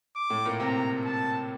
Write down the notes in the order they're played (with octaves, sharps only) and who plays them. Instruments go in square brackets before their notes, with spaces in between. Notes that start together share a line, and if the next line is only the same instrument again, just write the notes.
[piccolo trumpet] D6
[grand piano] A2 A3
A#2 A#3
[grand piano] C3 C4 [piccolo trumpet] A#5
[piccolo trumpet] A5